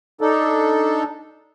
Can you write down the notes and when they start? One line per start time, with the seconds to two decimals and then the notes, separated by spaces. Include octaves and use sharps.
0.21 D4 D#4 A4